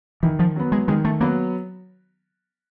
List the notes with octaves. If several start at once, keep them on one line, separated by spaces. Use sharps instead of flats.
D#3 E3
F3
F#3 B3
G#3
D#3 G#3
A3
F#3 A#3 B3